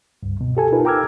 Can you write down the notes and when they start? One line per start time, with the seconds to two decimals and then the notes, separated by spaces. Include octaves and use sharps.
0.23 C#2 G2
0.41 B2
0.57 G4 A4 G#5
0.72 D#4 F4 A#4 B4
0.85 G5 A#5 D6 E6 F6 G#6